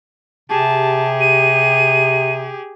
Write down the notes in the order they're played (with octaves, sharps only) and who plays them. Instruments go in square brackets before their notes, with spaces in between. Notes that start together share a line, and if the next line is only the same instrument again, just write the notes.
[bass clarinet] C3 [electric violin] G4 G#4 [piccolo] A5
[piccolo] D#7